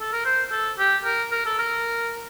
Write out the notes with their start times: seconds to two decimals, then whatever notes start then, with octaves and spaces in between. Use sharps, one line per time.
0.01 A4
0.13 A#4
0.25 C5
0.51 A4
0.79 G4
1.05 A#4
1.32 A#4
1.46 A4
1.59 A#4